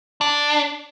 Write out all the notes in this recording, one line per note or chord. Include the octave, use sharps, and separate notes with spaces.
D4